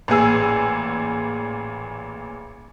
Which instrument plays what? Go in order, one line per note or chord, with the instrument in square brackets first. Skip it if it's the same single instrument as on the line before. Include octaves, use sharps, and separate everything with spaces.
[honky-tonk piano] A1 A#2 G#4 E6